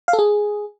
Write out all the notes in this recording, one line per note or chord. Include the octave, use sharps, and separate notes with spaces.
F5
A4
G#4